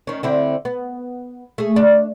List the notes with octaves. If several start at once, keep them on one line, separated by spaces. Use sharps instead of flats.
D#3 C#4
D3 C4 E4
B3
A3 G#4
D4